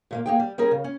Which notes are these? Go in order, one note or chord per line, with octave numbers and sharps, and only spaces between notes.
A#2 A3 A#3
A#3 G#4 G5
G3
G3 C#4 G#4 A#4
C#3
C#4